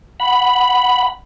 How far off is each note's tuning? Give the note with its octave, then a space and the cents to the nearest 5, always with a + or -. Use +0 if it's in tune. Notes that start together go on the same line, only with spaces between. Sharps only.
F#5 +0 B5 +0